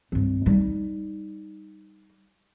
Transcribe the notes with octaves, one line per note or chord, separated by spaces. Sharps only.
G2 C4
G3 D#4